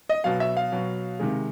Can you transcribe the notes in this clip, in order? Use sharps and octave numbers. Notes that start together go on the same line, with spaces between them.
D#5
B2 F#3 F5
E5
F5
B2 F#3
C3 D#3 G#3